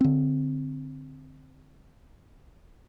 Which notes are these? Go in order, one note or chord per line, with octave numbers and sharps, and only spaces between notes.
D3 C4